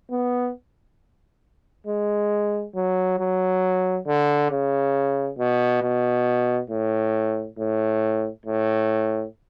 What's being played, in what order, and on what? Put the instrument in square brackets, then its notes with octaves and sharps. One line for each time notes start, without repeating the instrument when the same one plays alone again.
[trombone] B3
G#3
F#3
F#3
D3
C#3
B2
B2
A2
A2
A2